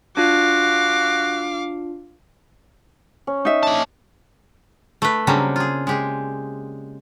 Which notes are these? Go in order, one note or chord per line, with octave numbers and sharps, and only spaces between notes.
D4 F4 F#4 F5 D6
C#4
D#4 E5
A#3 A5
A3 B4
C#3 F#3 G3 A#3 C4 D4
F4 G#4
G#3 G4 G#4